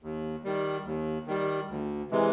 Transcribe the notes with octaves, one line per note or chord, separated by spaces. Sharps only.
D#2
D#3 G3
D#2
D#3 G3
D2
C3 E3 G#3